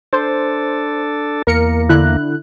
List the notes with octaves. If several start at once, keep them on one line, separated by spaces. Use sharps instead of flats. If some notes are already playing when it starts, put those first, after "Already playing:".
D4 A4 C5
E2 A#3 A#4 C#7
D3 E4 F#6